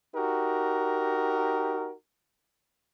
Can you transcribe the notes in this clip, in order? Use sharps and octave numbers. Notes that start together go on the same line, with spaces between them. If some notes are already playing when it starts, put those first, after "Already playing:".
D#4 F#4 G4 A#4